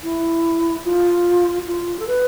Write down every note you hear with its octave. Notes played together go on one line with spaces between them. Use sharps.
E4
F4
F4
A4
B4